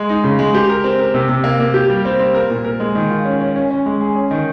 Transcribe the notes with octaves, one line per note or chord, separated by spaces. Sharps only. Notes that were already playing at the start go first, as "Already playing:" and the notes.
Already playing: G#3
D#4
C#3
G#3
G4
A#4
C4
A#4
C3
C3
A#3
A#3
G4
G3
C4
C4
A#4
A#2
A#4
G#3
D#3
F4
C#4
C#4
C#4
C#4
G#3
G#4
C#4
D#3